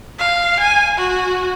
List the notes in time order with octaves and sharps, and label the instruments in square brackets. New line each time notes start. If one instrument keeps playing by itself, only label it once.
[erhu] F5
G#5
F#4